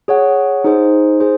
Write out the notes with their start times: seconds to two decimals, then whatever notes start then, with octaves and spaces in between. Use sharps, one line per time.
0.08 G#4 C#5 F#5
0.64 D#4 G#4 C5
1.20 G#4 C5